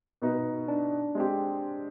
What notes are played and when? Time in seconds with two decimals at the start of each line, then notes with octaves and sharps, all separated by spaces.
0.22 B2 B3 D#4 B4
0.68 D4
1.15 G#3 C4 G4